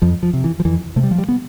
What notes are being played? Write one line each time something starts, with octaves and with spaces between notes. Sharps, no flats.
F2 F3
F3
C3
E3
F3
F2 E3
C3 A3
G3
F3
G3
B3